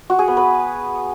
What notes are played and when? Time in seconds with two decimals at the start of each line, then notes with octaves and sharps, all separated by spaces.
0.10 F#4
0.19 G#4
0.28 B3
0.37 B4